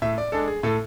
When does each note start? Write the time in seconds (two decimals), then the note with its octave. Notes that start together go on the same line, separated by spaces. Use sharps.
0.02 A2 E5
0.18 D5
0.32 G#3 D4 A4
0.48 G#4
0.63 A2 A4